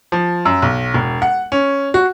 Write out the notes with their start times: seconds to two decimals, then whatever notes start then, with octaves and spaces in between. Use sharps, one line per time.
0.12 F3
0.45 F#2
0.62 B1
0.94 E1
1.22 F#5
1.52 C#4
1.94 F#4